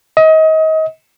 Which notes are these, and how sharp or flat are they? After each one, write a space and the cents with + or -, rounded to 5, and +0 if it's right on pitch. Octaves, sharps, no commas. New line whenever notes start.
D#5 +30